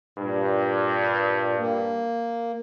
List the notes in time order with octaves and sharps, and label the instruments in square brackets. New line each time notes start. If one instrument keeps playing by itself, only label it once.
[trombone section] G2 [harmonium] A#2
[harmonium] A#3